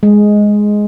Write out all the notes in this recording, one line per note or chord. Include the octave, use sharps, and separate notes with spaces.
G#3